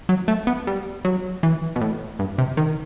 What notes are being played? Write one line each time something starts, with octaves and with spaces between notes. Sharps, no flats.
F#3
A3
B3
G3
F#3
E3
B2
A2
G2
C3
D#3